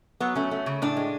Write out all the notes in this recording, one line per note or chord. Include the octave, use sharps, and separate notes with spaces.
F#3 B3
A3 C#4
A3
C#3
A2 D4
G#3